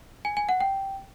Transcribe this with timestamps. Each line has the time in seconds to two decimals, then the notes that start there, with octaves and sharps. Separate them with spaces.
0.25 G#5
0.37 G#5
0.49 F#5
0.60 G5